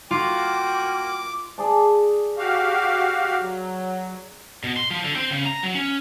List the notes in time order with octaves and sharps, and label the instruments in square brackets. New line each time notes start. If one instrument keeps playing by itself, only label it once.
[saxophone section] A#3 F#4 [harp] F4 [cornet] G5 [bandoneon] D6
[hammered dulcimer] G#4 D5 A5
[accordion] F#4 G4 F5
F#3
[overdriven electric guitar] B2
C6
F3
D3
C4
C#3
A#5
F#3
C#4